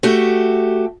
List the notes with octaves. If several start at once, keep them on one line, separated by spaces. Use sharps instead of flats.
A3 F#4 G4